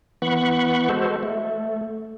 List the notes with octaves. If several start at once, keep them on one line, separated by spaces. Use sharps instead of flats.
E3 B3 F#5 B5 C#6
G#3 F#4 A4 C5
A3